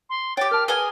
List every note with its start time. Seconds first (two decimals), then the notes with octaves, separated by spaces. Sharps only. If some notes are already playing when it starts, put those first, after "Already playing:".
0.10 C6
0.37 G4 C#5 G5 A6
0.51 A#4 A5 F6
0.68 G#4 A#4 B4 G#5 G7